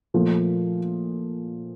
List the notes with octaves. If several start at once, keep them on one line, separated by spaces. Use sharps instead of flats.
A#2 F3 A3